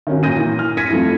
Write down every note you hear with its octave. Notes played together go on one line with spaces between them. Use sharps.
D#3 C#4 F#4
A#2 G6 A#6 D#7
E3
F6
G#6 A#6 B6 C#7 D#7
F2 F3 A3 E4